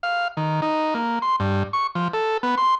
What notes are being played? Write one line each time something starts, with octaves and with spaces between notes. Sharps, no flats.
F5
D#3
D#4
A#3
C6
G2
C#6
F3
A4
B3
C6